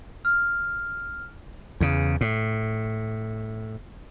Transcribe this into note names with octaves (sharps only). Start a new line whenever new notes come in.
F6
E2 C#3
A2